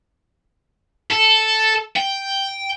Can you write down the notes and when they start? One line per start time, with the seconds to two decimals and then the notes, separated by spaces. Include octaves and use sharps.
1.11 A4
1.96 G5